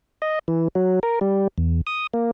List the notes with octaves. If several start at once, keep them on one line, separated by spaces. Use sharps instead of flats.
D#5
E3
F#3
A#4
G3
E2
D#6
A#3